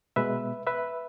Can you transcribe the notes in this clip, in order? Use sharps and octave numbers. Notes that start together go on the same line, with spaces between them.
B2 G#3 B3 B4 E5
B4 E5